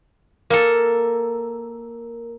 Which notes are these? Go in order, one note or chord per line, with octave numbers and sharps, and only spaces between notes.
A#3 A4 A#4